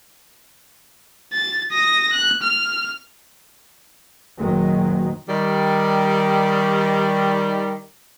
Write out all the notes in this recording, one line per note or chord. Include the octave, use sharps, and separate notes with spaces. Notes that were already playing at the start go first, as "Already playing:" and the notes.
A6
D#6 A#6
F#6
F6
F#1 A#2 D#3 F#3 G#3
D#3 G3